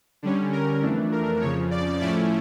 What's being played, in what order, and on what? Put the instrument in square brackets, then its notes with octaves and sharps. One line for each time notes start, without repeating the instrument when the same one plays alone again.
[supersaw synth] D3 G3 C#4
A#4
F2 E3 A3 D4
A#4
F2 C#3 F3 C#5
D5
A2 F3 A3 C#4 E4 D5